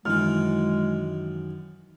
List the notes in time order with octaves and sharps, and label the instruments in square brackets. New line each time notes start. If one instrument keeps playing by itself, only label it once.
[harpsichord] F#2 D#3 [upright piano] E3 F6 [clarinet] G#3